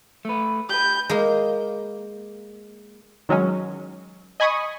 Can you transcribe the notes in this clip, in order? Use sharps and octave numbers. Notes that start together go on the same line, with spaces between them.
A3 B4
G4 B4 G6
G#3 A#3
D#3 F#3 G#3 C#4
D#5 G#5 B5 C#6 D#6